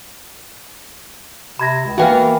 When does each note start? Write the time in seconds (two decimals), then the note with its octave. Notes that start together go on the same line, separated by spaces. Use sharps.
1.59 C3 B5 G#6 A#6
1.86 C#2
1.98 E3 A#3 B3 F#4 F5 G5